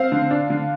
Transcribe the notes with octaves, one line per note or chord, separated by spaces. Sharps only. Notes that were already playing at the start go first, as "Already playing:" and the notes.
Already playing: C4 F5
D3
D4
D3